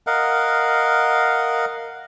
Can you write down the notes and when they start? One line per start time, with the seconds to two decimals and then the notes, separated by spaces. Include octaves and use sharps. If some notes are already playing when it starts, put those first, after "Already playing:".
0.07 A#4 D#5 F5 F#5